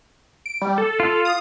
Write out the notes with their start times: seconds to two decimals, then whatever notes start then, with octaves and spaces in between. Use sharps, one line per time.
0.46 D7
0.62 G3
0.78 A4
1.00 F4
1.25 D#6